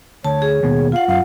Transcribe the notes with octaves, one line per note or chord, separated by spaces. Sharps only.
D2 C#5 A5
G#4
D#2 B2
F4 F5 F#5
F#2 F5